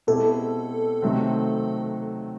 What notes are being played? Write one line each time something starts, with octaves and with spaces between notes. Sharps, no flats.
B2 G#3 C4 E4 G4 A4
C3 D#3 F#3 A3 C4